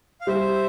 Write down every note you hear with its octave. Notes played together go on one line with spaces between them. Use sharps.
F5
G3 C5 E5